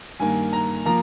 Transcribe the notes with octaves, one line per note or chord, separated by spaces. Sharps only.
G2 D#3 A#3 G#5
A#5
F3 A#3 A#5